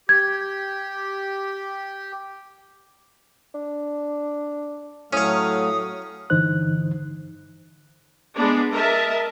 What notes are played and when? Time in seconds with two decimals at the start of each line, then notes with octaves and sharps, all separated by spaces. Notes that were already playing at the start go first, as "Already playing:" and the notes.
0.09 G4 G#6
3.54 D4
5.13 A2 F#3 A3 C#4 C#5 F5 D#6
6.30 G2 D3 E3 D#4 C5 F#6
8.35 G#3 B3 D4
8.72 A#4 D#5 E5 A5